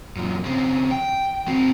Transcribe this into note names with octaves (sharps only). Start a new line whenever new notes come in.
F#2 A#2
C#3 C4
G5
C4 F#4